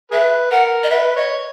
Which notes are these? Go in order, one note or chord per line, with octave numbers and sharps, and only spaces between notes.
G#4 B4 E5
A#4 F#5
D#5
B4 E5
C#5 D#5